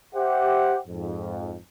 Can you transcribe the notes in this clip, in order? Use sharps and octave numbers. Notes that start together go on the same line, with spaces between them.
G4 C5 E5 F#5
F2 G#2